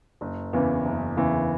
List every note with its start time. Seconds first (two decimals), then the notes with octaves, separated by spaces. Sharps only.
0.21 F#1
0.53 E2 C#3 E3
0.85 F#1
1.17 E2 C#3 E3